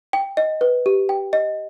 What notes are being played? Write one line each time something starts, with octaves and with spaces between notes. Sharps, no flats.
G5
D#5
B4
G4
G5
D#5